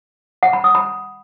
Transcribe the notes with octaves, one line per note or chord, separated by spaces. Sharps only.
F#5
B5
D#6
B5